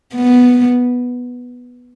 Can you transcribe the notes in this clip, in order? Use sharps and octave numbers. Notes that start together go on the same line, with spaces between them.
B3